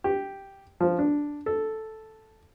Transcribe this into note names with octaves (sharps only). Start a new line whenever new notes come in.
G4
F3
D4
A4